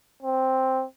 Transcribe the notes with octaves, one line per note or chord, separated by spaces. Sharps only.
C4